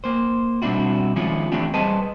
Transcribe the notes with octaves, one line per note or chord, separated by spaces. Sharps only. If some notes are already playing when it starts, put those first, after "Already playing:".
A#3 C5
B2 G3 C4 D4 E4 F#4
D#3 F3 G#3 C#4 E4 F4
E3 A3 C4 D4 E4 G4
G3 G#4 B4 C5 D#5 A5